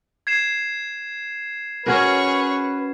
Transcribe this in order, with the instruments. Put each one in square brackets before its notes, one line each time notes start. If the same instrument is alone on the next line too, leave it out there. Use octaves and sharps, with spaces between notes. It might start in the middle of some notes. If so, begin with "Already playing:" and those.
[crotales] G#6 C7 E7
[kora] C#4 F#4 A#4 [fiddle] G#4 C#5 [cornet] B4